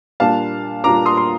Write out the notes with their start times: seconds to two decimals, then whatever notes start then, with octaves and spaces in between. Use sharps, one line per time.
0.20 A#2 G3 A#3 D4 F4 F5 A5
0.84 A#2 G3 A#3 D4 F4 A#5 D6
1.06 C6 D#6
1.17 C6